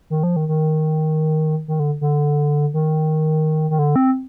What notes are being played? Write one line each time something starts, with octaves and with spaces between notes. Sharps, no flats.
D#3
F3
D#3
D#3
D#3
D3
D3
D#3
D#3
D3
C4